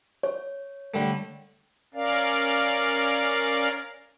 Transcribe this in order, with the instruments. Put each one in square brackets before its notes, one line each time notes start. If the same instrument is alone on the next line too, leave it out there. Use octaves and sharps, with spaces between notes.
[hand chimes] C#5
[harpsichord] D3 G3 A3
[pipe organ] C#4 A#4 D5 F5